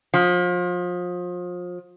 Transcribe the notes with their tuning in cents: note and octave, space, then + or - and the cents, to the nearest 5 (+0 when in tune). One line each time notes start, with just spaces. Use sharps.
F3 +30